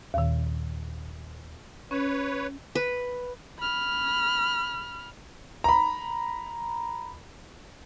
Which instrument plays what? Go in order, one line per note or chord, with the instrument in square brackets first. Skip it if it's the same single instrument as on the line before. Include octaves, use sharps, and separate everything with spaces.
[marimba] D#2 A#2 D#3
[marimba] C#4 [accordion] B4 C#5
[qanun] B4
[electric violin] B5 F6
[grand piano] A#5 B5